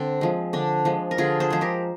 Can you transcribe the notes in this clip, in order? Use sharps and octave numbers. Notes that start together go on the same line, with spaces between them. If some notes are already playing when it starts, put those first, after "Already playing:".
Already playing: D3 C4
F3 G#3
D3 D4
F3 G#3
A#4
D3 F4 G#4
G#4 C5
F3 G#3 C5
G4 A#4